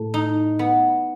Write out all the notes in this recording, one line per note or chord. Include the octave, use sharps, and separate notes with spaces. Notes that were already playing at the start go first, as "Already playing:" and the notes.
Already playing: A2
D#4
B3